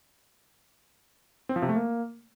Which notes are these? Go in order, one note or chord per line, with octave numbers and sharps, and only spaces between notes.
C4
F3
C3
A3
A#3